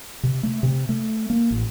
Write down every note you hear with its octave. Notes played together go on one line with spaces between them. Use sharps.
C3
A3
C3
A3
A#3
A1